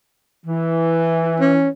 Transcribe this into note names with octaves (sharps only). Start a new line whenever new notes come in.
E3
C#4